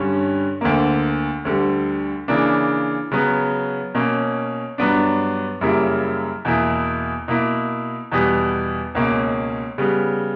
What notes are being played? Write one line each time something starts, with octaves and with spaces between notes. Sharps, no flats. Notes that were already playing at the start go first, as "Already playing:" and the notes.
Already playing: G2 D3 G3 C#4
D2 D3 A#3
D2 D3 G3
C#3 E3 A#3 D4
C#3 F#3 B3
B2 A#3 C#4
G2 F#3 B3 D4
F#2 C#3 G3 A#3 E4
E2 B2 A#3 E4
B2 A#3 E4
E2 B2 G3 B3
C#2 B2 A#3 C#4
C#3 G3 B3